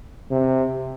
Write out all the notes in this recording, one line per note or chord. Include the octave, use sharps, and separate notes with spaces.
C3